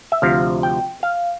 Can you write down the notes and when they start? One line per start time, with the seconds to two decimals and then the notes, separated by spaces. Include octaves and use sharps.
0.12 E5
0.22 D2 C3 F3 F5
0.63 G5
1.03 F5